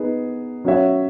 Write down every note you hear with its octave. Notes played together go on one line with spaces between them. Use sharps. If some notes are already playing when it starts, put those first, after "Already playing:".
Already playing: B3 D#4 G#4
F#3 C#4 F#4 C#5 E5